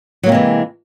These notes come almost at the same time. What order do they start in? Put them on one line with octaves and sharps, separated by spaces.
F#3 A#3 C3 G#3 E3